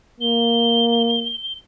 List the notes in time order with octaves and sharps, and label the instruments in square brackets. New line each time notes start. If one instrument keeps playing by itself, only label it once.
[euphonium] A#3 [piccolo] G7